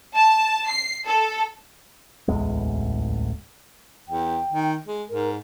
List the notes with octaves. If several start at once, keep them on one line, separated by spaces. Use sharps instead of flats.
A5
C7
A4
D1 A1 E2 G#3
E2 G5
D#3
G#3
G#2 A#4